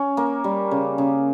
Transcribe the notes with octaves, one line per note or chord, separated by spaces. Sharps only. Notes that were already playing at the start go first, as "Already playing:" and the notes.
Already playing: C#4
A#3
G3
C#3
C#3